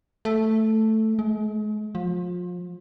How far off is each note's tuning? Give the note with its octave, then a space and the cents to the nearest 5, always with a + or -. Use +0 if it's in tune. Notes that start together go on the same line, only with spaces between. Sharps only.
A3 +0
G#3 +40
F3 +30